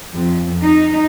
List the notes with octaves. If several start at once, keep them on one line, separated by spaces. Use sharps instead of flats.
F2
D#4